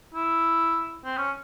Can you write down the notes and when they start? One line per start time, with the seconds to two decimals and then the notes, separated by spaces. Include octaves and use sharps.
0.14 E4
1.05 C4
1.18 C#4